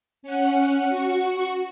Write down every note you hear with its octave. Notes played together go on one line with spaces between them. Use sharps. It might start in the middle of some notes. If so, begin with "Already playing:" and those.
C#4 F#5
F#4 C#6